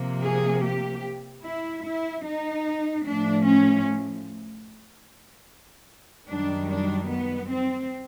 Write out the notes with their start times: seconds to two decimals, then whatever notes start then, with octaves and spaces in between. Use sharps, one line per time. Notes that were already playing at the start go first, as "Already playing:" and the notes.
Already playing: C3 F3 A#3
0.21 G#4
0.61 G4
1.43 E4
1.83 E4
2.23 D#4
3.04 A2 F3 A3 D4
3.45 C#4
6.27 F#2 D#3 G3 D4
6.68 D4
7.08 B3
7.48 C4